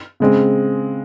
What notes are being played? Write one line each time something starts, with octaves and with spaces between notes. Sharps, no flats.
C#3 G#3 C4